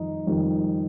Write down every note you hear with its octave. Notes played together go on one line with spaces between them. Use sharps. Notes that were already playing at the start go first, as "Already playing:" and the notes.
Already playing: F2 D#3 G3 D#4
F2 D#3 G3